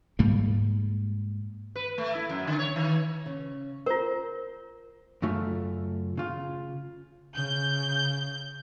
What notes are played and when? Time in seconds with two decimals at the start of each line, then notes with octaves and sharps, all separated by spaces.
0.19 G#2 G3 A#3
1.76 B4
1.98 A3
2.15 E4
2.29 F#2
2.47 D3
2.59 C#5
2.76 D#3
3.26 C#3
3.86 F4 A#4 C5
5.22 F#2 C#3 A3 F4 E5
6.17 C#3 F4
7.36 C#3 G6